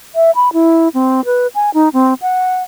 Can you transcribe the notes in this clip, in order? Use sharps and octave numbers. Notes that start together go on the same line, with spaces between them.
E5
B5
E4
C4
B4
G#5
D#4
C4
F#5